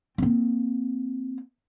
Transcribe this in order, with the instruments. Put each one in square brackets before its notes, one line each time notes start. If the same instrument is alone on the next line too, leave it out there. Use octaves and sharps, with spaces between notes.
[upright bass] A#3 C4